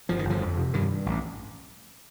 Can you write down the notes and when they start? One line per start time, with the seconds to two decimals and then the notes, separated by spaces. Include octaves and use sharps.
0.09 G1 F3
0.19 D#3
0.25 G1
0.30 D3 F3
0.41 F2
0.57 C3
0.74 G2 D#3
0.90 G2
1.06 A1